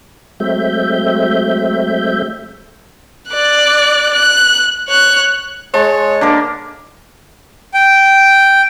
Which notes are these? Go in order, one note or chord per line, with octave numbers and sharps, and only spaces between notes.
F#3 G#3 A3 C4 E5 G6
D5 F#6
F#6
C#5 F#6
G#3 C#5 A5
D3 A#3 A#4
G5